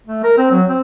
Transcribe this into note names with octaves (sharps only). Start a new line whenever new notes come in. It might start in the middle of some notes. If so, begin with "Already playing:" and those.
A3
A#4
C4
F#3
C4